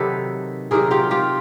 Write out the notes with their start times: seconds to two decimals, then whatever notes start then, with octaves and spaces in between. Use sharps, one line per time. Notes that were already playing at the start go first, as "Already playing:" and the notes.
Already playing: C3 D#3 F#3 A4 B4
0.71 C3 D#3 F#3 G#4 A#4
0.91 F4 G4
1.11 F4 G4